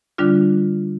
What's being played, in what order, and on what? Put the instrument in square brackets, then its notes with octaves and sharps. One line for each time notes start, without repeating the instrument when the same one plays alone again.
[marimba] D3 G3 D4 F4